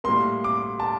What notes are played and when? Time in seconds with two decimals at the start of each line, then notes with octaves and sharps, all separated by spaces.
0.04 A2 G3 A#3 C6
0.44 D6
0.80 A5